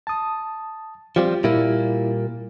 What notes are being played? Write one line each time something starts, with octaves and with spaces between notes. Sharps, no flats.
A5 D#6
F3 G3 C4 F4 G4
A#2 G3 A#3 E4